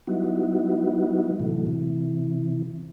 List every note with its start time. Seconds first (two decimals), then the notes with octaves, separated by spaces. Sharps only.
0.07 F#3 G3 B3 D#4 E4 F#4
1.40 A2 C3 E3 F#3 A3
1.67 C3 E3